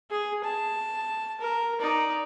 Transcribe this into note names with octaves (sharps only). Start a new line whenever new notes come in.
G#4
A5
A#4
D#4 D5